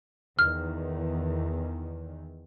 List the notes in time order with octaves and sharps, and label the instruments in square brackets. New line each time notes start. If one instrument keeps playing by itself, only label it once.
[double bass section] E2 D#3 [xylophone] F6